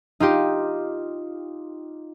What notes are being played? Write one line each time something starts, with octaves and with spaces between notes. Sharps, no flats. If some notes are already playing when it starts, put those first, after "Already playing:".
D#4 F4 G4